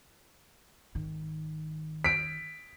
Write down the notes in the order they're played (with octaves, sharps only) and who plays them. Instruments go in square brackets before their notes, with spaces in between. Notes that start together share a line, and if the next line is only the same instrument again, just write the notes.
[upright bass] G#1 D#3
[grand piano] B6 D7